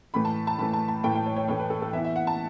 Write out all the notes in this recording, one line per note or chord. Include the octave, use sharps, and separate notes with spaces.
A2 E3 A3 B5
A5
A5
A2 E3 A3 B5
A5
A5
A2 E3 A3 G5
G5
C#5
C#5
A2 E3 A3 C#5
B4
A4
A4
E3 B3 E4 E5
E5
F#5
A5